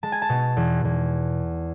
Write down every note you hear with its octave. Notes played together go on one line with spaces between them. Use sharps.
G#3 A5
G#5
A5
B2
E2
E2